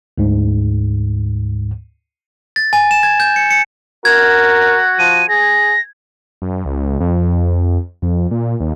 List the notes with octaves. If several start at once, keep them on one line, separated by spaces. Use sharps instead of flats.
D2 G#2
A6
G#5
E7
G#6
G6
C#7
C#7
F#4 A#4 G#6
F3 D#7
G#4 A#6
F#2
C#2
F2
F2
A#2
D#2